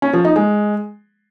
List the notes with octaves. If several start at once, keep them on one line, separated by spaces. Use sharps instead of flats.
C#4
F3
D#4
G#3